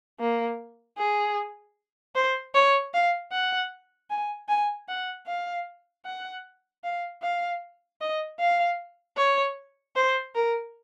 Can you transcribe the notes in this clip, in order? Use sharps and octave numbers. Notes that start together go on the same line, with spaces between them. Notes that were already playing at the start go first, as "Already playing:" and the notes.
A#3
G#4
C5
C#5
F5
F#5
G#5
G#5
F#5
F5
F#5
F5
F5
D#5
F5
C#5
C5
A#4